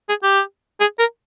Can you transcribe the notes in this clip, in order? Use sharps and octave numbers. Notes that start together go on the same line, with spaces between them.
G#4
G4
G#4
A#4